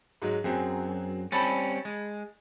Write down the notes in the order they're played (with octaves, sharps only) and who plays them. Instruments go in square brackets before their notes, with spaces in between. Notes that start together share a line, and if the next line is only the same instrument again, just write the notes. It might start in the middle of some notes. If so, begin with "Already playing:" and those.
[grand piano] G#2 F#3 G#3
[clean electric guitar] F#2 [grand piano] F#3 C4 G#4
[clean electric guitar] G3 C4 C#4 [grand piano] A5 B5 A6
[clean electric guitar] G#3